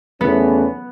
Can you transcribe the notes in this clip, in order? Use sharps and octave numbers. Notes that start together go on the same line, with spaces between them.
E2 C#3 E3 A3 B3 C#4